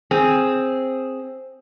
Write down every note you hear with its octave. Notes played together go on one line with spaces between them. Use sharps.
C4 G#4